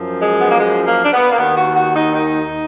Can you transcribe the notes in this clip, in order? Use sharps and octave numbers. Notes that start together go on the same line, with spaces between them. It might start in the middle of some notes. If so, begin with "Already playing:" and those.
Already playing: F#2 F3
G#3
B3
A#3
G#3
A#3
D4
B3
A#3
D#2 D#3 B3
F#4
F#4
D#4
D#4